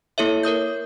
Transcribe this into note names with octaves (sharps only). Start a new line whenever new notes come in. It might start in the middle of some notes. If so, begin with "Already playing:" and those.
A#3 E4 A4 C#5 E5
A#4 C#5 D#6 G6